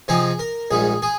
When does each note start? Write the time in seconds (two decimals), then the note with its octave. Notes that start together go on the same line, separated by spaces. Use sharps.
0.08 C3 F3 C4 D#4 G#4
0.39 A#4
0.71 A#1 G#2 G3 G#4
1.02 G#4